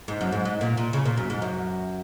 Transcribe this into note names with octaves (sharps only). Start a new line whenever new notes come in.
G#2
F#2
G#2
G#2
A#2
A#2
C#3
A#2
F#2
G#2
F#2